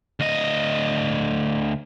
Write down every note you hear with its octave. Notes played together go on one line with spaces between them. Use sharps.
D2 D#5